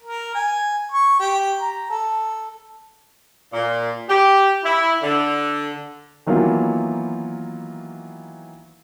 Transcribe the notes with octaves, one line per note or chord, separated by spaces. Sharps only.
A#4
G#5
C#6
G4
A#5
A4
A#2
G4
E4
D3
D#3 E3 F#3 A#3 B3 F4